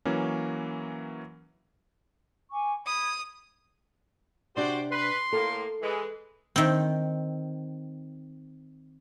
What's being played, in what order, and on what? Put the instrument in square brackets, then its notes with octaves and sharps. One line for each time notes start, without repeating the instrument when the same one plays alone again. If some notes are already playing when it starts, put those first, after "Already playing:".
[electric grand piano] E3 F#3 A#3 C#4
[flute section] G#5 C#6 D6
[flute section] B5 G#6 [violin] D#6
[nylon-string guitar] C3 D4 G4 [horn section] F#4 C5 D5
[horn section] B4 [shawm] C6
[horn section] A2 A#3 [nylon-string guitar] A4
[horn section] E3 G#3
[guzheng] D#3 C4